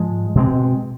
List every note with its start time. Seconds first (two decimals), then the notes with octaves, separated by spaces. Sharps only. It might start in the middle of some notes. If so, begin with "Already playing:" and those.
Already playing: G#2 F3 G#3
0.35 B2 G#3 C4